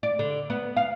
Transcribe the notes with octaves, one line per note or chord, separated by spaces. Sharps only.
D5
D3
B3
F5